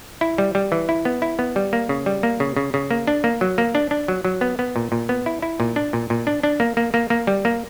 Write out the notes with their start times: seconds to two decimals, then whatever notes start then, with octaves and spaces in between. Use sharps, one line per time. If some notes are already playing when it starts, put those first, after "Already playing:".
0.21 E4
0.38 G3
0.55 G3
0.72 E3
0.89 E4
1.05 B3
1.22 E4
1.39 B3
1.56 G3
1.73 A#3
1.89 C#3
2.06 G3
2.23 A#3
2.40 C#3
2.56 C#3
2.74 C#3
2.91 A#3
3.07 D4
3.24 A#3
3.41 F#3
3.58 A#3
3.75 D4
3.91 D4
4.08 F#3
4.25 F#3
4.41 B3
4.59 B3
4.76 A#2
4.92 A#2
5.09 B3
5.26 E4
5.42 E4
5.60 A#2
5.76 D4
5.93 A#2
6.10 A#2
6.27 D4
6.43 D4
6.60 A#3
6.77 A#3
6.94 A#3
7.10 A#3
7.27 G3
7.45 A#3